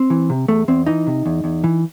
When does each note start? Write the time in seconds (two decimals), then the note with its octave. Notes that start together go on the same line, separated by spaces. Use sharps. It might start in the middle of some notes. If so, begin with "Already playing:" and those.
Already playing: C4
0.10 E3
0.30 C3
0.48 E2 A3
0.68 E2 C4
0.86 E3 D#4
1.07 C3
1.26 E2
1.44 E2
1.64 E3